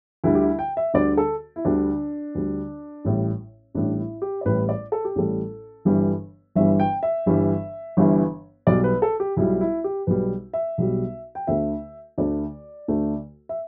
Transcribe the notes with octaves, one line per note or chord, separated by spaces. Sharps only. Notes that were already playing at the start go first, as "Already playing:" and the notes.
D2 D3 G3 E4
G4
E4
G5
E5
D2 D3 G3 D5
A4
E4
D2 D3 G3 D4
D2 D3 G3
A1 A2 G3
A1 A2 G3 D4
E4
G4
D5
A1 A2 G3 B4
D5
A4
G4
A1 A2 G3 A4
G1 G2 E3 G3
G1 G2 E3 G3 E5
G5
E5
G1 G2 E3 G3
G1 G2 E3 G3
B1 B2 G3 D5
B4
A4
G4
B1 B2 G3 E4
E4
G4
B1 B2 G3 B4
E5
B1 B2 G3
G5
D2 D3 A3 E5
D2 D3 A3 D5
D2 D3 A3
E5